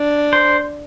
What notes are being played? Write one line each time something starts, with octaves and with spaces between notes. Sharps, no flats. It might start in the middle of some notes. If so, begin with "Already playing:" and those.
Already playing: D4
C5